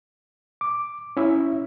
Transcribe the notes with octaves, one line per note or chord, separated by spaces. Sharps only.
D6
C#4 E4 E5